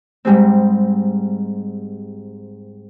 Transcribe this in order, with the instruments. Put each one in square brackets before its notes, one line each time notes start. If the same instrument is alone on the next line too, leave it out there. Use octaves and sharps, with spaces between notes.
[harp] G#2 G3 G#3 C4